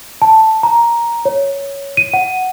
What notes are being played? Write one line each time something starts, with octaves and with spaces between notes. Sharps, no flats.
A5
A#5
C#5
D#7
F#5